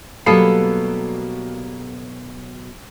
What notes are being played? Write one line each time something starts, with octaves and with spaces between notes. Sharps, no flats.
B2 F#3 G3 A#3 B3 A4 C7